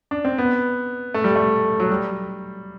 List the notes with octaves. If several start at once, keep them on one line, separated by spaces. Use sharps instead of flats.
D4
C4
B3
A3
G3
A3
F#3
G3